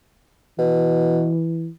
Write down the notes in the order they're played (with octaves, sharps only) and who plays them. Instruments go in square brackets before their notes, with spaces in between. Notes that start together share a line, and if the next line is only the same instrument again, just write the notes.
[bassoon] B2 [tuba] E3